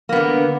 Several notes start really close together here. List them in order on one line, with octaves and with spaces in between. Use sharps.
A#3 B3 D3